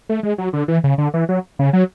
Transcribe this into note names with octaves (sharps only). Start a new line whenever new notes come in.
A3
G#3
F#3
D3
E3
C#3
D3
E3
F#3
C#3
F#3